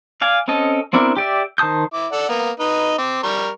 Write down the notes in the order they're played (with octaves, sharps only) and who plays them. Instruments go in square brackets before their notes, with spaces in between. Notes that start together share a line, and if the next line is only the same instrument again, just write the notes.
[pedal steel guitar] D5 F5 G#5
C4 C#4 A4 D#5
B3 C4 D4 E4 A#4
G4 D5 E5
D#3 C5 A5 D#6 G6
[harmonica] E4 D6
A4 D5 F#5
A#3 B3
D#4 B4 D#5
C4 D6
G3 A#4 C#6